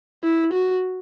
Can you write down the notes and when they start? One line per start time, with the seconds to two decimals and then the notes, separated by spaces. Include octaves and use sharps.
0.24 E4
0.53 F#4